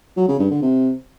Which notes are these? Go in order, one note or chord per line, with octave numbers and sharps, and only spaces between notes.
F#3
C#3
G2
D3
C3